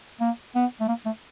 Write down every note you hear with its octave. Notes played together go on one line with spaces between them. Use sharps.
A#3
B3
A3
A#3
A3